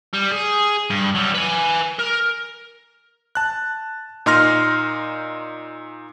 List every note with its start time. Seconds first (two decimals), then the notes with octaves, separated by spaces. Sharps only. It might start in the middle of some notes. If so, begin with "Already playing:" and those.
0.14 G3
0.32 G#4
0.90 G2
1.15 F#3 G3
1.35 B4 G#5
1.99 A#4
3.35 A5 F#6
4.26 A#2 D#4 C6 F6 A#6